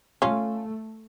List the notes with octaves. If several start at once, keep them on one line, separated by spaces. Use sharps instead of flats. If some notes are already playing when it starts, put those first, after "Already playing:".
A3 C#4 F4